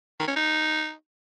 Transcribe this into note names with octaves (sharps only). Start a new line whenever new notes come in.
D#3
C#4
D#4